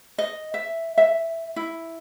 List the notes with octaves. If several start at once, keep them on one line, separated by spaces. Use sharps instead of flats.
D#5
E5
E5
E4